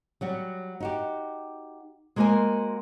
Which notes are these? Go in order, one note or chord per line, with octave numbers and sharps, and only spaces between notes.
F#3 G3 F#4
D#4 F#4 G4
G#3 A#3 F#4 A#4 C5 G#5